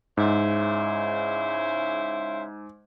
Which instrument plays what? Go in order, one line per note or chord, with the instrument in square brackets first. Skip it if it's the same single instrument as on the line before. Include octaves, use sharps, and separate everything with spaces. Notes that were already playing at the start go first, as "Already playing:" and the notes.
[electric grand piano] G#2 [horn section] C#3 E4 C5